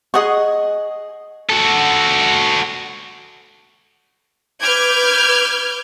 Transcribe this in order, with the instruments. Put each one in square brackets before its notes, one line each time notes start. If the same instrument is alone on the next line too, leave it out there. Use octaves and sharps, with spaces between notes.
[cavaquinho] G#4 D#5 F#5 C#6
[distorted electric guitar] F#4 A4
[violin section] B4 D6 F6 G6 G#6